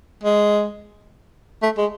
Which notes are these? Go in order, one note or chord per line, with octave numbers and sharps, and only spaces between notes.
G#3
A3
G#3